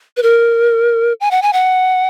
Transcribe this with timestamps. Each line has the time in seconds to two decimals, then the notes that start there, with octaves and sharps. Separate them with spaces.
0.17 B4
0.23 A#4
1.21 G#5
1.31 F#5
1.42 G#5
1.53 F#5